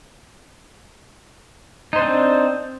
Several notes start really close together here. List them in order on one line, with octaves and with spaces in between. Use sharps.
D#4 C5 D4 C4